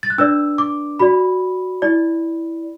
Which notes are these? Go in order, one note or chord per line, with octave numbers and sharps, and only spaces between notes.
A6
F#6
D4 B4 D5 E6
D6
F#4 D5 B5
E4 D5